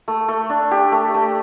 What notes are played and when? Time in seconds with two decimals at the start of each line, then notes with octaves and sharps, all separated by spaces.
0.08 A3
0.28 A3
0.50 D4
0.71 G4
0.92 A3
1.14 A3